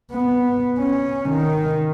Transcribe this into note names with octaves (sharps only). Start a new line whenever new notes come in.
B3
C#4
D#3